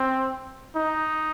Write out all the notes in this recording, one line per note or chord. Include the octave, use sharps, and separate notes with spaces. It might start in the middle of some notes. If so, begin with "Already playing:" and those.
Already playing: C4
D#4